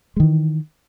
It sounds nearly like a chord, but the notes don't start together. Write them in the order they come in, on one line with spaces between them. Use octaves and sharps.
G#3 D#3 E3